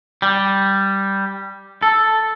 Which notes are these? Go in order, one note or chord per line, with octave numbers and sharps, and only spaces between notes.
G3
A4